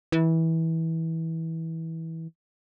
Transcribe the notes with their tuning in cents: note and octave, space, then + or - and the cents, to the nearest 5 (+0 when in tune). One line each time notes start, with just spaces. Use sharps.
E3 -20